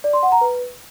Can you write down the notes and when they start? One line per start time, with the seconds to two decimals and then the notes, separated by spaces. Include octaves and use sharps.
0.04 D5
0.13 C6
0.23 F#5
0.32 A#5
0.41 B4